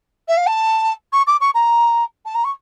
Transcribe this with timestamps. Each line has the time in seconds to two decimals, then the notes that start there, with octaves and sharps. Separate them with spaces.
0.28 E5
0.37 F5
0.46 A5
1.12 C#6
1.27 D6
1.40 C#6
1.54 A#5
2.25 A5
2.34 A#5
2.44 C#6